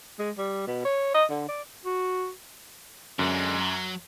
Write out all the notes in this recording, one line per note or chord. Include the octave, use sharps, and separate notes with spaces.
G#3
G3
B2
C#5
D#5
D3
D5
F#4
F#2 D3 G#3
F#3